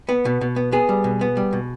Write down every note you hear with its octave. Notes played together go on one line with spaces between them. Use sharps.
B3
B2
B2
B3
B3 G#4
G3
B2
B3
G3
B2